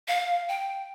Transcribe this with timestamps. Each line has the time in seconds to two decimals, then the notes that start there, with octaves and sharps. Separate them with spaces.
0.08 F5
0.48 G5